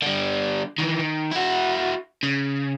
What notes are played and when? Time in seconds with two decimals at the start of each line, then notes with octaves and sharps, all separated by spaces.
0.02 D3 G3
0.78 D#3 E3
0.99 D#3
1.32 E4 F#4
2.23 C#3